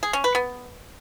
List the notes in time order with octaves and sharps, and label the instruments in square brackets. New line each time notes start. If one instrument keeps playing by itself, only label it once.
[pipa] G#4
C#4
B4
B3